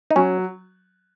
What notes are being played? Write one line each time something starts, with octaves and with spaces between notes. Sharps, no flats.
D#4
F#3 C#4